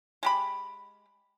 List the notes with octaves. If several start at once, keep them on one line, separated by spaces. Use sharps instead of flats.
G#3 G4 B5